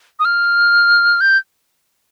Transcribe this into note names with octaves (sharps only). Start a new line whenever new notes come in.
D#6
F6
G6